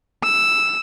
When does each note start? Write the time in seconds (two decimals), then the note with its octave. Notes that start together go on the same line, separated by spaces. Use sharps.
0.24 E6